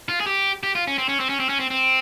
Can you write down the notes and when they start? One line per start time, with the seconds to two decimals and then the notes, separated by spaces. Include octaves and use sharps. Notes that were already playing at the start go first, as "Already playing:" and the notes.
0.09 F4
0.20 G#4
0.27 G4
0.63 G4
0.75 F4
0.87 C#4
0.98 C4
1.09 C#4
1.20 C4
1.29 C#4
1.40 C4
1.49 C#4
1.60 C4
1.71 C4